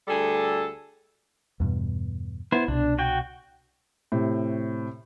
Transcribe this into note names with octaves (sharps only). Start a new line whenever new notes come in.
D2 G3 G#4 A4
E2 G2 B2
B3 E4 C5
C2 B2 D4
F#4 G5
A2 C3